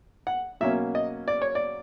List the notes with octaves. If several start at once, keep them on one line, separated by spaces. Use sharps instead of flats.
F#5
B2 F#3 A#3 C#4 E5
D#5
D5
C#5
D5